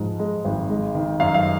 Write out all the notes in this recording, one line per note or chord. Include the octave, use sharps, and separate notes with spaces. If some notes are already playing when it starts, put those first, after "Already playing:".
Already playing: G#2 F3
G#3
G#1
G#3
D#3
F#2 F5
F5